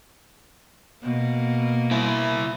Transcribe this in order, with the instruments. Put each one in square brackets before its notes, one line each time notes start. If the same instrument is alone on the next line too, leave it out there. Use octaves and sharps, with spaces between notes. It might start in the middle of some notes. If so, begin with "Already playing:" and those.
[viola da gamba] B2 A#3
[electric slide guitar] E4 C5 E5